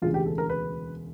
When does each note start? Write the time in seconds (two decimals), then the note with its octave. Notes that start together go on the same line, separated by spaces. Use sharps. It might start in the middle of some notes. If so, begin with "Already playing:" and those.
0.02 E1 D2 C#3 E3 F4
0.14 G4
0.26 A4
0.38 A#4
0.50 B4